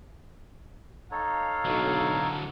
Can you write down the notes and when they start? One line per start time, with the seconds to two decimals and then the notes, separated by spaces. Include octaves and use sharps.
1.12 D#4 A4 C#5 F5
1.65 B1 D3 F#3